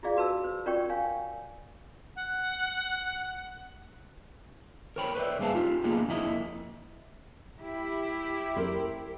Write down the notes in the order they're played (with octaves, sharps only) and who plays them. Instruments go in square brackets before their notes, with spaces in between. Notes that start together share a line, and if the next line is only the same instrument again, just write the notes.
[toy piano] E4 F4 G#4 D5 F5
F#4 B4 A5 E6
C5
F4 A#4 C#5 D5 G5 C#6
C#5 F5 G#5
[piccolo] F#5
[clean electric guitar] A#4 C5 C#5 G5 B5
B4 C5 D5 E5
G2 A#3 G#4 E5 F5 A5
D#4 F4 G4
A#3 B3 D4 D#4 F4 G#4
F2 A#3 E4 D#5
[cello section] E4 G4
[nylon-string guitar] A#4 C5